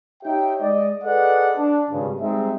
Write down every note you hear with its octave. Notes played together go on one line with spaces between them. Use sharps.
D#4 G4 C#5 E5 G5
G#3 D5 D#5
G#4 A4 B4 D5 D#5 F#5
D4
G#1 G2 C#3
G3 G#3 C4 D#4 E5